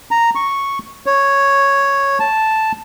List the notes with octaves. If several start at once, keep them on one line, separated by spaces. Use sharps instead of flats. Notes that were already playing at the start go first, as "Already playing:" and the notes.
A#5
C#6
C#5
A5